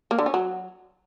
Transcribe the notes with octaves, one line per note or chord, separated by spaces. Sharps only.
A#3
D3
C#4
F#3